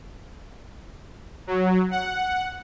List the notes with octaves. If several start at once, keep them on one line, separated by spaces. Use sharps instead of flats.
F#3
F#5